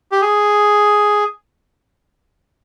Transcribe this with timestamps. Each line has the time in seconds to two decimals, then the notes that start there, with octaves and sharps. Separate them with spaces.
0.12 G4
0.22 G#4